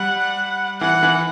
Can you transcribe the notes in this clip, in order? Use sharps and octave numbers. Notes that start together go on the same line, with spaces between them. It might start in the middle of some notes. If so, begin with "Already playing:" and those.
Already playing: G3 F#5
E3 F#5
E3